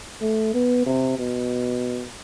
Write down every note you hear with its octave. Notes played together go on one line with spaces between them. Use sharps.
A3
B3
C3
B2